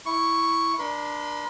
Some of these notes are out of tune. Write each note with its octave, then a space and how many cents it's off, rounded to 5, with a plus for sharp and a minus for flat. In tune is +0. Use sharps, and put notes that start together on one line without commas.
E4 +0 C#6 +0
D4 +10 A#4 +45 C6 -45